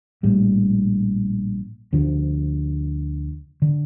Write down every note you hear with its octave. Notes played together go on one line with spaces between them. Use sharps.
A#1 A2 G3
D2 D3 F3
D3